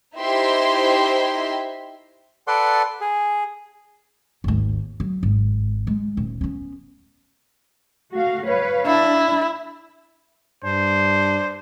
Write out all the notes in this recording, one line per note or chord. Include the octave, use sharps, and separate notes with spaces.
D#4 E4 G4 C5 E5 C6
A4 B4 D5 F#5 C6
G#4
G#1 D#2
F#3
G#1
G#3
D#1
B3 C#4
A3 F#4 F5
B4 C#5 F5
D4 E4
G2 D4 C5